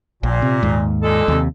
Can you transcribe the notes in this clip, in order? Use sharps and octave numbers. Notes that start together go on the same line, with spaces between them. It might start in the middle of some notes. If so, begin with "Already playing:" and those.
A#1 A#2
C3
D#2 G#2
A#2 G#3 A4
D#2 C3